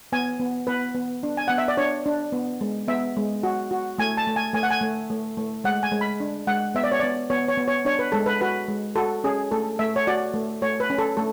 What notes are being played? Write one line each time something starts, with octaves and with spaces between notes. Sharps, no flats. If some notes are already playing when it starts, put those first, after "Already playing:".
B3 G#5
B3
B3 B4
B3
D4
G#5
B3 F#5
E5
D5
D4 C#5
D4
B3
G#3
B3 E5
G#3
F#4
F#4
A3 G#5
A5
A3
G#5
A3 G#5
F#5
G#5
A3
A3
A3
G#3 F#5
G#5
G#3
B5
D4
G#3 F#5
B3 E5
D5
C#5
B3 D5
B3 C#5
C#5
B3
C#5
D4 C#5
B4
G#3 A4
B4
F#4 B4
G#3
F#4 A4
C#4 G#4
A3 A4
A3 E5
C#5
F#4 D5
A3
A3 C#5
B4
C#4
A4
A3 A4